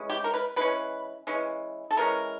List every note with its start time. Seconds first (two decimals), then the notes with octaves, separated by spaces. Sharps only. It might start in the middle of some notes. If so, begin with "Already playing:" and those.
Already playing: E3 G#3 C#4
0.10 G4
0.24 A#4
0.34 B4
0.56 E3 G#3 C#4 B4
1.27 E3 G#3 C#4
1.91 A4
1.97 E3 G#3 C#4 A#4